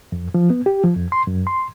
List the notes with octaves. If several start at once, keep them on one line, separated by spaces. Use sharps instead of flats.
F2
F3
B3
G4
F3
F2
C6
F#2
C6